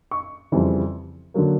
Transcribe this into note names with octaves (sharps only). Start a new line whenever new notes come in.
C#6
F2 C#3 E3 G3 C4
D3 F#3 A#3